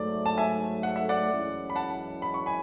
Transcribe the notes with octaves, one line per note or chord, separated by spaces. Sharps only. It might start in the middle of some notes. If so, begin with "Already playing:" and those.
Already playing: G#2 F#3 A3 D5
A5
E5 G#5
F#5
E5
D5 F#5
F#2 E3 G#3 C#4 E4
B5
F#5 A5
B5
C#6
G#5 B5